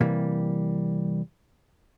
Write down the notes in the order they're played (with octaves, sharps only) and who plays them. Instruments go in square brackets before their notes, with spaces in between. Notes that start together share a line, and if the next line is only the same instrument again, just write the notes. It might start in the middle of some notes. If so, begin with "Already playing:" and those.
[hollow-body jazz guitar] C3 E3 G3 A#3